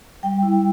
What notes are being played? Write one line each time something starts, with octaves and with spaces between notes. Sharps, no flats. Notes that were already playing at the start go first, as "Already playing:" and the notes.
G3 G5
E4